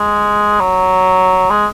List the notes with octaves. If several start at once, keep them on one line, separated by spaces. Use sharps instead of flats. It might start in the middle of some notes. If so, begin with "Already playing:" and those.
Already playing: G#3
F#3
G#3